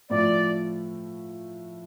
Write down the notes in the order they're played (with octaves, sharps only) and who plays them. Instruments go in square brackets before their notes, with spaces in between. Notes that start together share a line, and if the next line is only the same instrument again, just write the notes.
[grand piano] A2 F3 A3 [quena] D5